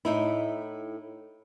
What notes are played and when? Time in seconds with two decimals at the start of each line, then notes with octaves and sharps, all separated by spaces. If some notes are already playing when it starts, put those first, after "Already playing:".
0.05 A2 D#4 E4